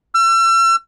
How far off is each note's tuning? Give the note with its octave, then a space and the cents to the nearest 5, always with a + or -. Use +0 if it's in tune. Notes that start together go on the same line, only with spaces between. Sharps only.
E6 +40